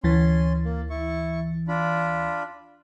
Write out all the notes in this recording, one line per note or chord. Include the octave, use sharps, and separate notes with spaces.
D2 E3 C#4 C6 A6
A#3
E4 C#6
D4 F4 B5